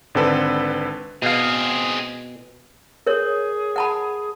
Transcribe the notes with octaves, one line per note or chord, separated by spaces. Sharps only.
G#1 D3 C4 A4 B4
B2 C4 G#4 F5
G#4 A#4 C#5
F#5 A5 B5